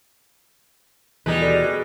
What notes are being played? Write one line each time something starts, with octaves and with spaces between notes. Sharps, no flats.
D#2 B2 E3 G3 G#3 D#4 B4
F#4 A4 D5
B2 F#6